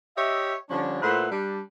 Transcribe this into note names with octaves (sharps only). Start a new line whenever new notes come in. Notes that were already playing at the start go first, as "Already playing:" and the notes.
G4 C#5 D#5 E5
D3 F3 G3 C#4 D4
A#2 A3 E4 B4 C5 F#5
G3 D4